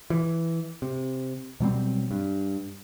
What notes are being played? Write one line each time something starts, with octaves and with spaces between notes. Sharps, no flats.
E3
C3
B2 F#3 G3 C4
G2